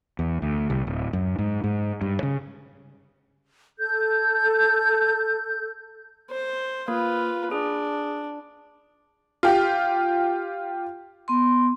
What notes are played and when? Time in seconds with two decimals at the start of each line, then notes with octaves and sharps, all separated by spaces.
0.19 E2
0.42 D2
0.70 C2
0.87 D1
1.13 F#2
1.38 G#2
1.64 G#2
2.01 G2
2.23 C#3
3.78 A4 G6
6.31 C5
6.88 A#3 F4 B4
7.51 D4 G#4
9.43 F4 G4
11.28 B3 C6